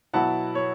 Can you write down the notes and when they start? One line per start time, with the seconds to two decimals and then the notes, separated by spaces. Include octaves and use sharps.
0.14 B2 F#3 B3 E4 F#5 A5
0.55 C#5